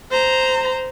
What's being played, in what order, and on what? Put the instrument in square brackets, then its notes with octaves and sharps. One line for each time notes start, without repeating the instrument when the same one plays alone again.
[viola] C5 A#5